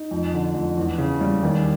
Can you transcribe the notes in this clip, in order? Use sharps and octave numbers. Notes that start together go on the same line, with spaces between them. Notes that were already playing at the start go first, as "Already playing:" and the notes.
Already playing: D#4
F2
D3
F2
E2
C#3
G3
D#2